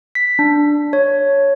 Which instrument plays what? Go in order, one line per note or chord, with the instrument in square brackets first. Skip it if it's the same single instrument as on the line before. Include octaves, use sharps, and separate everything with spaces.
[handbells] B6
D4
C#5